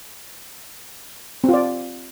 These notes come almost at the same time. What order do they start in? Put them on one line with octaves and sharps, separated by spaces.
C4 F4 D5